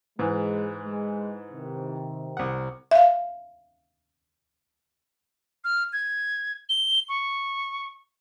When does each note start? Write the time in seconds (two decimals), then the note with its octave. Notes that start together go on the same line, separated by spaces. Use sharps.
0.19 G#2 E3 G#3
0.85 G#3
1.52 C3 D#3
2.37 C2 F#5
2.91 E5 F5
5.64 F6
5.93 G#6
6.69 G7
7.09 C#6